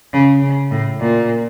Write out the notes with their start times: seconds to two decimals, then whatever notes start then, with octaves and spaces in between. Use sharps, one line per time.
0.13 C#3
0.42 C#3
0.71 A2
1.00 A#2